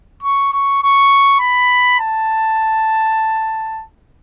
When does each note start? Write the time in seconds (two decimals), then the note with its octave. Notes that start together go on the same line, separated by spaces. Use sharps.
0.23 C#6
0.52 C#6
0.82 C#6
1.40 B5
2.00 A5